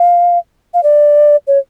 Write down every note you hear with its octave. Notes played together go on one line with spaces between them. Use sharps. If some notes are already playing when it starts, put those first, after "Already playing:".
Already playing: F5
F5
D5
C#5